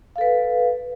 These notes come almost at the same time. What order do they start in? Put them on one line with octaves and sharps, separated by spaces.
F5 A4 B4